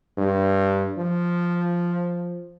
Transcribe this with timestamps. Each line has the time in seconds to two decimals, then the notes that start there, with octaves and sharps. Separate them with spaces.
0.18 G2
0.98 F3